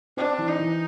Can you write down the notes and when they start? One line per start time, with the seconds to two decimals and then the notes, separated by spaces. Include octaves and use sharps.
0.17 C4 D4
0.38 E3
0.49 D#4
0.59 E3